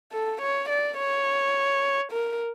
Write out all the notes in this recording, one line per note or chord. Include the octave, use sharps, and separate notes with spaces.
A4
C#5
D5
C#5
A#4